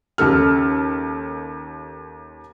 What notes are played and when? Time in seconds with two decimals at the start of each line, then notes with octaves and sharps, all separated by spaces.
0.18 D#2 C#3 A4 F6